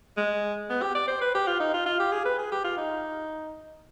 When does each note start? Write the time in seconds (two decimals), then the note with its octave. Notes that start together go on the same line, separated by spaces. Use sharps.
0.17 G#3
0.70 B3
0.82 G4
0.95 D5
1.08 C5
1.21 B4
1.35 G4
1.47 F4
1.60 D#4
1.74 F4
1.86 F4
2.00 G4
2.12 G#4
2.25 B4
2.38 G#4
2.52 G4
2.64 F4
2.77 D#4